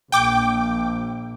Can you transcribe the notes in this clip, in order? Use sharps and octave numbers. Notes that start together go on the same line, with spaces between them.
A#1 G5 D6